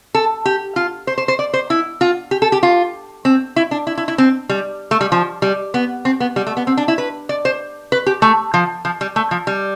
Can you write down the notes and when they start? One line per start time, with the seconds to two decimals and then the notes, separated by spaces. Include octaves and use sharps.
0.15 A4
0.45 G4
0.76 F4
1.07 C5
1.18 C5
1.28 C5
1.39 D5
1.54 C5
1.70 E4
2.01 F4
2.31 G4
2.42 A4
2.52 G4
2.63 F4
3.25 C4
3.56 E4
3.71 D4
3.87 E4
3.98 E4
4.08 E4
4.18 C4
4.49 G3
4.91 A3
5.01 G3
5.12 F3
5.42 G3
5.74 B3
6.05 C4
6.20 B3
6.36 G3
6.47 A3
6.57 B3
6.67 C4
6.77 D4
6.88 E4
6.98 B4
7.29 D5
7.45 C5
7.92 B4
8.06 G4
8.22 A3
8.54 F3
8.85 F3
9.01 G3
9.16 A3
9.31 F3
9.47 G3